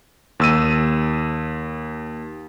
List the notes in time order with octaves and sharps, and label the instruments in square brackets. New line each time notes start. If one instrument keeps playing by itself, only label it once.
[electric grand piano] D#2 E6 D#7